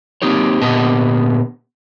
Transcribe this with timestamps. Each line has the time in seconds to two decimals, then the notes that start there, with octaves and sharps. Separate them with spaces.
0.22 A#3 C4 D#4 G4 C#5
0.62 A#2 D3 B3 G4 D#5 A5